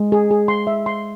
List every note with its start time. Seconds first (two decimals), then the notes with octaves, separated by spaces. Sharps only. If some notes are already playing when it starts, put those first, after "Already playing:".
Already playing: G#3
0.12 G#4
0.31 G#4
0.48 C6
0.67 E5
0.86 C6